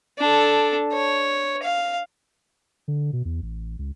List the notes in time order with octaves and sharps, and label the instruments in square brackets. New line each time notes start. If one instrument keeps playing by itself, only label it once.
[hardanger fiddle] D4 A4
C#5
F5
[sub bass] D3
B2
E2
A1
C#2